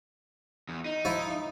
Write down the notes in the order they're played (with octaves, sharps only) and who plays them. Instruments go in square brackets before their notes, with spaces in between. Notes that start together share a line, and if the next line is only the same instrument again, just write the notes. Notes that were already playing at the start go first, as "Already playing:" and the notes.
[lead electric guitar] E2
D#4
[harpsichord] F3 E4